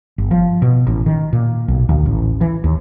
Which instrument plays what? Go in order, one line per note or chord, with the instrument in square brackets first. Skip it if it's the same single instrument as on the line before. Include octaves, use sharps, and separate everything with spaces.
[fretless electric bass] G1
F3
B2
A1
D#3
A#2
B1
D2
A1
E3
D#2